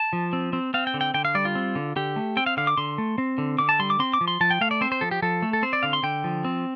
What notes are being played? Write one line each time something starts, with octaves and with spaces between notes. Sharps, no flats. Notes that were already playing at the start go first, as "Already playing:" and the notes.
Already playing: A5
F3
C4
C4
C4 F5
G5
D3
G5
D3 G5
F5
G3 D5
F4
C4
D3
D3 G4
A3
C4 G5
F5
D3 F5
D6
D3 C6
A3
C4
D3
D3 D6
A5
G3 C6
D6
C4 C6
D6
F3
C6
F3 A5
G5
A3 F5
D5
C4 C5
C5
F3 A4
G4
F3 A4
A3
A4
C4 C5
D5
D3 F5
C6
D3 G5
F3
C4